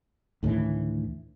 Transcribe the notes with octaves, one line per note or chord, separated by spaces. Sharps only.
D2 A2 D#3 E3